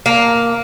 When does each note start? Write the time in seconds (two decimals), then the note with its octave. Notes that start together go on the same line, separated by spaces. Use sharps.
0.06 A#3